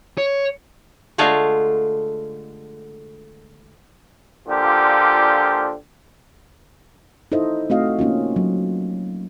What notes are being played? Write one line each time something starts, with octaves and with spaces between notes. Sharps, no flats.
C#5
D3 G#3 A3 F4
A#2 D3 F3 F4 G4
D#4 E4 A4 C5 D#5 E5
A3 C4 F#4 D#5 F5
A#3 C#4 D#4 F4
F#3